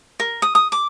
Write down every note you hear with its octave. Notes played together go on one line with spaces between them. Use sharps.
A#4
D#6
D#6
D6